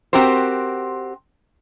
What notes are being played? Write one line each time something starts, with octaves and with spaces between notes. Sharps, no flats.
C4 F#4 G4 A#4 C5